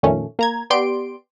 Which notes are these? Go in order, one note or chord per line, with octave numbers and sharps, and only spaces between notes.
F2 A#2 D#3 A3 C#4
A#3 A#5 G#6
B3 G4 D5 C6 D7